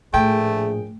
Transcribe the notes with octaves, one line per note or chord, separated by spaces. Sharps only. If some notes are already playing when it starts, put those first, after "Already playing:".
A#1 A2 A3 G#4 G5